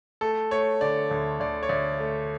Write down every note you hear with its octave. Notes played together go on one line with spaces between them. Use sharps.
A3 A4
A3 C#5
D3 D5
D2
D2 D5
C#5
D2 D5
A3